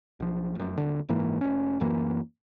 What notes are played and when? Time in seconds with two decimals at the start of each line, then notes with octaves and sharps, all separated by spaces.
0.20 B1 F3
0.55 F1 F#2
0.77 D#1 D3
1.09 F#1 G#2 E3 A#3
1.41 F1 C#4
1.80 D1 F#2 E3 A#3